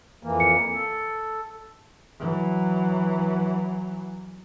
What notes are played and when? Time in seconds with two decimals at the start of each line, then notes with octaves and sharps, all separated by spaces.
0.23 F2 E3 A#3
0.40 C#7
0.74 A4
2.20 E3 F#3